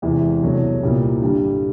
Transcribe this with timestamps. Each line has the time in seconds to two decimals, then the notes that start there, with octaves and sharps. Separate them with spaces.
0.02 E2 C3 E3 G#3
0.42 C2 B2 F#3 A3
0.81 C2 A#2 G3 A#3
1.21 G2 D3 G3